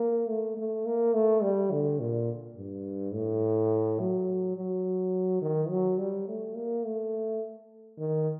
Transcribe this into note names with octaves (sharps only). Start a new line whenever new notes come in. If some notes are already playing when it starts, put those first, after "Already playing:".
Already playing: A#3
A3
A3
A#3
A3
G3
D3
A#2
G2
A2
F#3
F#3
D#3
F#3
G3
A3
A#3
A3
D#3